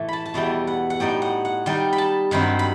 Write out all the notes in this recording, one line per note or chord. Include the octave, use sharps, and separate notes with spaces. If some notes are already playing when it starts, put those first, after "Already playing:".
Already playing: A2 E3 A3
A5 B5
A5
E2 B2 G3 B3 E4 G5
F#5
F#5
A2 G3 D#4 G5
F#5
F#5
D#3 G3 D#4 G5
B5
A5
G2 D#3 F#3 C4 B5
B5